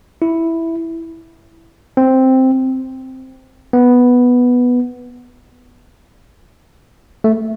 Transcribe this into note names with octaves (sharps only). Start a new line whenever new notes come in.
E4
C4
B3
A3